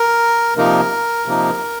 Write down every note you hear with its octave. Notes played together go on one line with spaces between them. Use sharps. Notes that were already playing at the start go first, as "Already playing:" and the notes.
Already playing: A#4
C3 F3 A#3 D#4 A#4
C3 F3 A#3 D#4